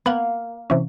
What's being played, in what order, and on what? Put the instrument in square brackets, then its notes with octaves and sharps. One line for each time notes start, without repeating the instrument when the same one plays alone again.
[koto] A#3 [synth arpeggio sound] B3 F#5
[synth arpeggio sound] C3 E3 C#4